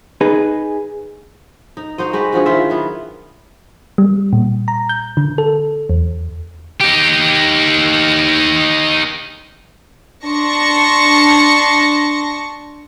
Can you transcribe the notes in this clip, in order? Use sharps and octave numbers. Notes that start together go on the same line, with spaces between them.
D#4 G#4 B4
D#4
D#4 F#4 C5 D#5
G#3 F#4 G4 B4
D3 F3 F#4 G#4
D#3 E4 F4 E5
F#3 B3
G3
A#2
A#5
G6
D3
A4
E2
D#4 G4
D4 A5 C6 C#6 A#6 C#7